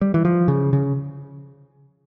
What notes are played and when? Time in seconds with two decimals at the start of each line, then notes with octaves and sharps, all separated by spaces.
0.01 G3
0.14 E3
0.25 F3
0.48 C#3
0.73 C#3